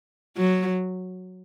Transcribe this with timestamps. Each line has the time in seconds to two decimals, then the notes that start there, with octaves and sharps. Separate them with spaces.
0.37 F#3